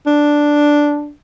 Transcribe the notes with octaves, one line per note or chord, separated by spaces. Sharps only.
D4